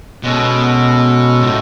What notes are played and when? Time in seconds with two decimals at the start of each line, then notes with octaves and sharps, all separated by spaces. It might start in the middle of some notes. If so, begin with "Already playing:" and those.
0.23 B2 G#3 C#4 F#4 A4
1.41 A2